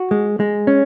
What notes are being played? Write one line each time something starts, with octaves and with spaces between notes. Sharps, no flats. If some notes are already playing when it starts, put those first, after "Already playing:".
Already playing: F#4
G#3
G#3
C#4